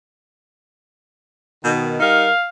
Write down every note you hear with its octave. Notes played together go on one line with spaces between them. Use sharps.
B2 D#3
G3 D#4 A#4 F5